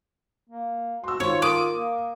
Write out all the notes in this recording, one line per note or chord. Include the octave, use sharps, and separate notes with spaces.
A#3
F#4 C6 E6
G#1 F4 C#5
A#4 D6 D#6 D#7
A#3